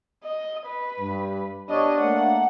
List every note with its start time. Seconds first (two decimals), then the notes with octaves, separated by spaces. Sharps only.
0.24 D#5
0.66 B4
1.00 G2
1.70 B3 D4 G4 C#5 D#5
2.01 A3 A#3 F#5